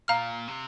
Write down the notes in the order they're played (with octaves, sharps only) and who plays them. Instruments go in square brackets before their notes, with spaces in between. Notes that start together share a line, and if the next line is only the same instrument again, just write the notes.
[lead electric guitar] A#2 [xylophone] F5 A#5 F6
[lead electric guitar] C3